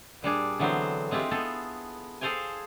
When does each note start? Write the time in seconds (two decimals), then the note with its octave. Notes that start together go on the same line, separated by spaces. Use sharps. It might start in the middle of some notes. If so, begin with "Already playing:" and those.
0.22 A#2 G3 D4 G#4
0.59 D3 E3 F#3 B3 C4 C5
1.11 G#3 C4 E4 F4 G4
1.31 B3 G#4 A4
2.21 G#4 A4 C5 F5 G5 G#5